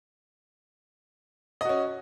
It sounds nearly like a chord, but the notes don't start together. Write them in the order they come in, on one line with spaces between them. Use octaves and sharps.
D#5 F#4 C#4